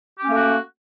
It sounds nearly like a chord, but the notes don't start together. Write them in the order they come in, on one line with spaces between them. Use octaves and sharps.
G4 C#4 A#3 A3 F#4